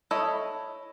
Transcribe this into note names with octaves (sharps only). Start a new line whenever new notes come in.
E4 A4 C#5 D#5